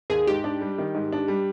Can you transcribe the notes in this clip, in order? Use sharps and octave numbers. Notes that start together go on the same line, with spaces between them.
D#2 G#4
G#2 G4
D4
G3
D#3
G#2
D4
G3